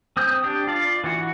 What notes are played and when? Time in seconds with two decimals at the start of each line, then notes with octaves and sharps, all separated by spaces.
0.17 C4 D#6 G6
0.44 D4 G4
0.67 F4 D5
1.04 E3 F#4